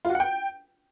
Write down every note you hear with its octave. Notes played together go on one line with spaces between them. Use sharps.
F4
F#4
F#5
G5